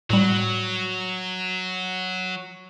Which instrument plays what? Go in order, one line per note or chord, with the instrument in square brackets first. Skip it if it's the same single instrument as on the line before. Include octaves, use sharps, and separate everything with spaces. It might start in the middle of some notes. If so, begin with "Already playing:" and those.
[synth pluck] A2 G3 [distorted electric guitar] F#3